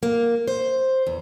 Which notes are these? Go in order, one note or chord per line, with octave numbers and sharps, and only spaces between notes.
A#3
C5
E2